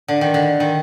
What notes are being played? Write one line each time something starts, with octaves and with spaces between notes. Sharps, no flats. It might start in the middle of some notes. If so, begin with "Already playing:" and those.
D3
D#3
D3
D#3